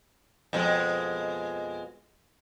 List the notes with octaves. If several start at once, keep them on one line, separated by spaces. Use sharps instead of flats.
F2 B2 G#3